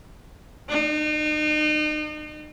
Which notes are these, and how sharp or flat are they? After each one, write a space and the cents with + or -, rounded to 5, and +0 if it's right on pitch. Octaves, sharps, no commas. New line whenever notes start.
D#4 -40